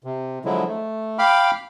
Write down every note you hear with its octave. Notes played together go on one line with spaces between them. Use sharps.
C3
D3 F3 F#3 G#3 E4
A3
F5 G5 B5 D6 F6